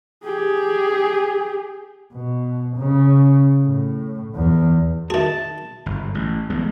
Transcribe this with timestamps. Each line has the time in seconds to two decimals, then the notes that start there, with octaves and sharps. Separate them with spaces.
0.24 G4 G#4
2.13 B2
2.76 C#3
3.63 A2
4.35 E2
5.10 D#3 F#4 G#4 E5 A5
5.86 G1 G#2
6.15 A1
6.50 A1 G#3 B3